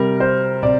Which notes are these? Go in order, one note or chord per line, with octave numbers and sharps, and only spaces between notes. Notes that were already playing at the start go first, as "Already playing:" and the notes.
Already playing: C3 G3 A#4
C5
C3 D5